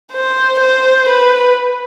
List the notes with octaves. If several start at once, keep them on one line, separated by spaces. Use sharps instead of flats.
C5
C5
B4